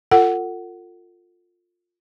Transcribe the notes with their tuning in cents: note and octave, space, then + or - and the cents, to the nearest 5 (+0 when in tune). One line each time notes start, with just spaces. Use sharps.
F4 +10 A4 +35 F#5 +10